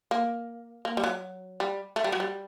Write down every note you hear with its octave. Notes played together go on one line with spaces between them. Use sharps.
A#3
A#3
G3
F#3
G3
A3
G3
F#3
G3